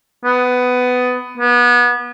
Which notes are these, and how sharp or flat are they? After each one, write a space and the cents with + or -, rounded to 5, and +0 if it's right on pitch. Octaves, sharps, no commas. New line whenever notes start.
B3 +15
B3 -30